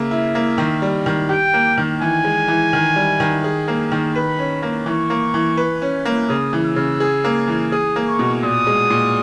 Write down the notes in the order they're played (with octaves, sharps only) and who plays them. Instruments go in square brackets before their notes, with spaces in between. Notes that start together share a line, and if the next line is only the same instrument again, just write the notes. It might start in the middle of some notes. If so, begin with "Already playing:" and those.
Already playing: [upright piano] C#3 A#3 [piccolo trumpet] E5
[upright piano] E4
A#3
D#3
G3
D#3
[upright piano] G4 [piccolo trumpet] G5
[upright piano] A#3
D#3
[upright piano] E3 [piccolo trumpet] G#5
[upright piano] G#3
E3
D#3
G3
D#3
G#4
A#3
D#3
[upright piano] B4 [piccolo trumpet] B5
[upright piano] C#4
A#3
[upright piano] E3 [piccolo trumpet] C#6
[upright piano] A#3
E3
B4
C#4
A#3
[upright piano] C#3 [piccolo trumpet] D#6
[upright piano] E3
[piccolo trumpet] E6
[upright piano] C#3
G#4
A#3
E3
[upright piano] G#4 [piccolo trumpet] D#6
[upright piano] A#3
[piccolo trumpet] C#6
[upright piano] B2
[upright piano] A#2 [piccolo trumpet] D#6
[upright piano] G#3
A#2